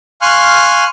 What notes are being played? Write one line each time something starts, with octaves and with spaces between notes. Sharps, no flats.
F5 G#5 C6 C#6 F6 F#6